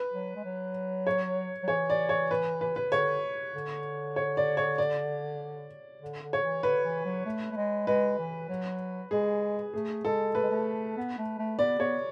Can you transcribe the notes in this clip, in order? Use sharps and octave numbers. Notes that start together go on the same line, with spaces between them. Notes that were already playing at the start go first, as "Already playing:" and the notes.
Already playing: B4
F#3
G#3
F#3
C#5
F#3
E3 C#5
D5
C#5
B4
B4
B4
D3 C#5
D3
C#5
D5
C#5
D5
D3
D3
C#5
E3
D3 B4
E3
F#3
A3
A3
G#3
G#3 B4
E3
F#3
G#3 G#4
A3 G#4
G#3 A4
A3 B4
G#3
A3
B3
A3
A3
B3 D5
B3 C#5